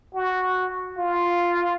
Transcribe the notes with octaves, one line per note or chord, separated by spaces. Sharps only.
F#4
F4